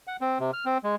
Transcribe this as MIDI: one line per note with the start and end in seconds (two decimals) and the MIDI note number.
0.07 0.17 78
0.21 0.38 60
0.40 0.51 48
0.53 0.65 89
0.66 0.78 60
0.84 0.95 56